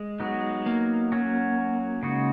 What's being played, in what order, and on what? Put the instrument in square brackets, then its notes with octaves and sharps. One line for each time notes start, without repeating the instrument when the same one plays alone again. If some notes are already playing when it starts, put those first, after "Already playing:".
Already playing: [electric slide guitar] G#3
[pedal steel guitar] F#3 B3 D#4 F#4
[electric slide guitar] A#3
[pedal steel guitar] F#3 C#4 F#4
C#3 G#3 D#4 F#4